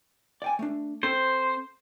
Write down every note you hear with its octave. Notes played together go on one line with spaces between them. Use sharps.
D5 G5 G#5
A3 D4
C4 A4 C5